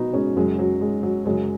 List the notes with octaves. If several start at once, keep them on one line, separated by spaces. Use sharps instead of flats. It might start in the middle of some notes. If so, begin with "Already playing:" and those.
Already playing: B2 B3 D#4 F#4
G#3 C#4
F#2 C#3 F#3 G#3
F#3
G#3
F#3
F#2 C#3 F#3 G#3